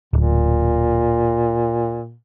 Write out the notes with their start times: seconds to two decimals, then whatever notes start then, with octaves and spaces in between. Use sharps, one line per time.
0.13 D1 A#2